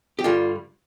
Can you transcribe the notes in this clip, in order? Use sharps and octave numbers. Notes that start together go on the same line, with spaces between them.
G4
G2 D3 G3 F4